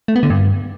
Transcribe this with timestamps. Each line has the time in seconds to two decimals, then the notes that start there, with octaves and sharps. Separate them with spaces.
0.08 A3
0.16 B3
0.23 D3
0.30 G2